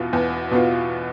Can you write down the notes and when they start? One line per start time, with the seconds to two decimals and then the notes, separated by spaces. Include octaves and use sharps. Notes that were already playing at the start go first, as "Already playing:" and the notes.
Already playing: E2 B2 B3 F4
0.13 E2
0.51 B2 B3 F4